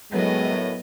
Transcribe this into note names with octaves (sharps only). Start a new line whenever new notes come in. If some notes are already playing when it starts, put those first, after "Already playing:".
F#2 A2 F#3 G#3 B3 D#5